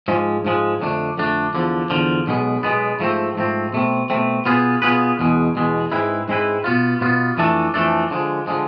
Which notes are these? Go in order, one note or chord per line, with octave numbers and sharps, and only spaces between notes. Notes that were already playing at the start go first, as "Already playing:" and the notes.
G#2 F3 G#3
G#2 F3 G#3
F2 D3 A3 D4
F2 D3 A3 D4
E2 D3 F3
E2 D3 F3
B1 B2 G#3 B3
B1 B2 G#3 B3
G#2 F3 A3 C4
G#2 F3 A3 C4
B2 A3 C4
B2 A3 C4
B2 B3 F4 G#4 B4
B2 B3 F4 G#4 B4
E2 B2 G#3
E2 B2 G#3
G#2 G#3 C4 E4 B4
G#2 G#3 C4 E4 B4
B2 B3 F4
B2 B3 F4
F2 E3 A3 D4 A4
F2 E3 A3 D4 A4
D3 F3 G#3
D3 F3 G#3